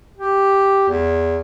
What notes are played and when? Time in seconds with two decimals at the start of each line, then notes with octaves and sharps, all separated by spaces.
0.17 G4
0.88 E2